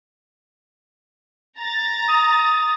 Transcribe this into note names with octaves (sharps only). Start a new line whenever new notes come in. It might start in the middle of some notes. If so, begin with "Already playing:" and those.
A#5 A6
D#6